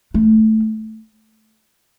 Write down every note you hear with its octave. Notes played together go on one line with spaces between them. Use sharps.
A3